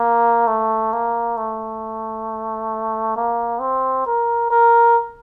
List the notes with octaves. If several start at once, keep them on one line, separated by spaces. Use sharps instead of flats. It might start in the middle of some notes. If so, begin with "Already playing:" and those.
Already playing: A#3
A3
A#3
A3
A#3
C4
A#4
A#4